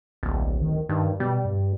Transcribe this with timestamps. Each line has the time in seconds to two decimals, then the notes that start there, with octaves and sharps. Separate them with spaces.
0.23 D1 A#1
0.62 D#3
0.89 G2 D#3
1.20 B2 G3
1.45 G2